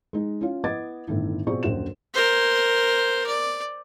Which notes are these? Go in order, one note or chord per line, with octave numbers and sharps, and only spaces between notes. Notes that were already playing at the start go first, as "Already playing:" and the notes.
G#3 D#4
C#4 F4
B3 E4 D#5 D6 G#6 A6
G1 A2 D#3 E4
B2 C4 F4 G#4 D5 C#6
D#1 A#1 F#2 F#4 C5 E7
A#4 C5
D5